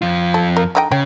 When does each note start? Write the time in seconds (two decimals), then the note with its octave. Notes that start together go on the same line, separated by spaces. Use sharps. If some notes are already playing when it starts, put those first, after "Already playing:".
0.02 F2 F4
0.34 A4
0.57 A#4
0.75 D3 D#4 G5
0.91 C#3 C#5 G5